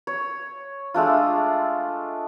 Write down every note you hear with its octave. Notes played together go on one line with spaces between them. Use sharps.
C#5
G#3 A3 D4 F4